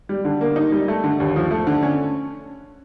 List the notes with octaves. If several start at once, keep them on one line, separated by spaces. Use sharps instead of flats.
G3
D3
A#3
D#4
G3
A3
D3
D#2
F3
A3
D3
C#4